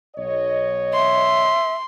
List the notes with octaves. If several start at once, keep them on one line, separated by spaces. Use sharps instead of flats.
B1 C#5 D#5
E5 C6